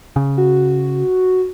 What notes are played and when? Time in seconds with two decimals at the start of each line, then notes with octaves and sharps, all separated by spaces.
0.16 C#3
0.37 F#4